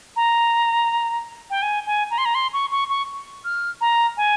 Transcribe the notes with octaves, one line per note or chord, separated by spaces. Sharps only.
A#5
G5
G#5
G#5
A#5
C6
A#5
C6
C#6
C#6
C#6
F6
A#5
G#5